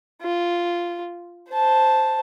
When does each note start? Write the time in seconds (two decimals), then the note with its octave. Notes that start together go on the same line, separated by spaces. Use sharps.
0.21 F4
1.51 C5 A5